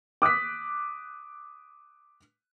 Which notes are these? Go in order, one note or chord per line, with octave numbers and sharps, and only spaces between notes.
D6 D#6 F#6 B6